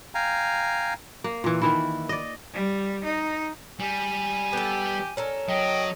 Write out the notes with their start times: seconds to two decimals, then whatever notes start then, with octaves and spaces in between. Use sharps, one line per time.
0.15 F5 G5 G#5 A#5
1.24 A#3
1.44 A#2 E3
1.62 D#3 E3 E4
2.09 D5 D#5
2.53 G3
3.04 D#4
3.80 G3 G#5
4.53 B3 G4 A4
5.17 C#4 A4 A#4
5.49 F#3 D#5 G5